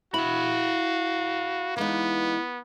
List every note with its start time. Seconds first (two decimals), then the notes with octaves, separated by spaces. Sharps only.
0.14 E4 F#4 F5 B5
1.77 E3 G#3 B3 D#4